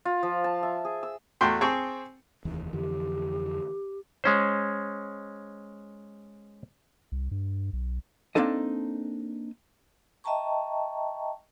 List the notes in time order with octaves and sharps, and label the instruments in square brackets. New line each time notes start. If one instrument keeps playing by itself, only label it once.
[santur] F4
F3
A5
E5
G#4
E6
[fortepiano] E2 A3 F#4 G5 C6
C4 G#4 G5 A5 C#6
[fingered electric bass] F1 D#2 E3
[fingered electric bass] F2 D3 E3 [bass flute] G4
[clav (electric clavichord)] G#3 C#4 C5
[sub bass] C2
G2
B1
[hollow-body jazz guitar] A#3 C4 D4 D#4 A4 D#5
[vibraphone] D#5 E5 G5 A5 A#5 C#6